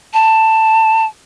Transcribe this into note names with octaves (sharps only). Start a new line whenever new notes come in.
A5